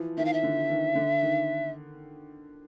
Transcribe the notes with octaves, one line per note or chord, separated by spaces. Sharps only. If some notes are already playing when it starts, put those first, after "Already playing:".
Already playing: E3 F3
D#3 E5
F5
E5
D3
D#3
D3
D#3